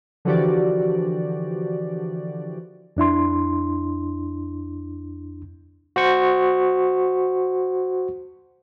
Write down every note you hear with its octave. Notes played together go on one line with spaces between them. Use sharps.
D3 E3 F3 F#4 G4 D5
F2 D4 E4 C6
F#4 C5 C#6